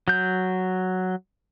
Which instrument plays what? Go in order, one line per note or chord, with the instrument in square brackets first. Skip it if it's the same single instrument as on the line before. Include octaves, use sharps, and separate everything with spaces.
[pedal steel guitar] F#3 G6